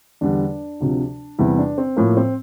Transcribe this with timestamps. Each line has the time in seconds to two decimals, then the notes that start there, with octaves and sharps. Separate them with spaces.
0.21 E2 D3 G3 D4
0.80 D2 C3 F3
1.38 E2 C3 G3 E4
1.58 D4
1.78 C4
1.96 A2 F3 A#3
2.17 C4